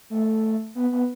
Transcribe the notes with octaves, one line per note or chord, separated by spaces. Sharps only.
A3
B3
B3